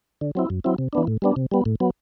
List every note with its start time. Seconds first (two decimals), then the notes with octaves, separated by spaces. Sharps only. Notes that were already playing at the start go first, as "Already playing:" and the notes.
0.21 D3
0.35 F#3 C4 E4
0.50 F#2
0.64 F#3 C4 E4
0.78 C3
0.93 E3 B3 D4
1.07 A2
1.22 G3 B3 D4
1.36 C3
1.51 G3 B3
1.65 A2
1.80 F#3 B3